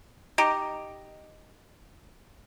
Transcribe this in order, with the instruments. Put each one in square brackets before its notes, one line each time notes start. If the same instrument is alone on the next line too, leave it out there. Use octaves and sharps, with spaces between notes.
[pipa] D#4 G4 D#5